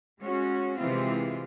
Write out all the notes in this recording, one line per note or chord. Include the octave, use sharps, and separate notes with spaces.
G#3 C#4 F#4
C3 E3 G#3 C4 F4